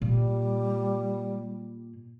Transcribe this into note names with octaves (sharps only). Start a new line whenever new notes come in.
A#2 G3